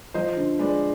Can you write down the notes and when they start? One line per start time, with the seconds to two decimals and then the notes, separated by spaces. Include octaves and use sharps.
0.14 F3 C5 D#5
0.37 D3
0.59 G#3 B4 D5